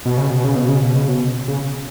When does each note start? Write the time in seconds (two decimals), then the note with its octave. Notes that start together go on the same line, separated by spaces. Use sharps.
0.05 B2
0.18 C#3
0.30 B2
0.44 C#3
0.56 B2
0.69 C#3
0.83 B2
0.95 C#3
1.08 B2
1.48 C#3